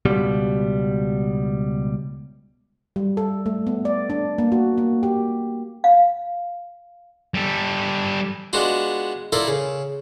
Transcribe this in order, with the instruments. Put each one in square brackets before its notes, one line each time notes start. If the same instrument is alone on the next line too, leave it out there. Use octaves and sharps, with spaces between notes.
[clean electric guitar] C#2 B2 G3
[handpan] G3
A4
A3
B3
D5
D4
A#3
F#4
A#3
G4
[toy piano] F5
[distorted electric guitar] G3 A4
[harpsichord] G#3 B3 D4 F4 F#4
E4 F4 A4 A#4 D5
C#3